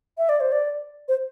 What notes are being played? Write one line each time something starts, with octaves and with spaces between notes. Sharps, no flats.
E5
D5
C5
D5
C5